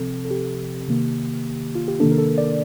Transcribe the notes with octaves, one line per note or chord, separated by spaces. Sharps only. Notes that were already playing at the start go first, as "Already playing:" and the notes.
Already playing: C3 F3 C4 A4
A4
G4
C3 D#3 A#3
F4
G4
C3 D#3 A#3 D4 A4
A#4
A4
D5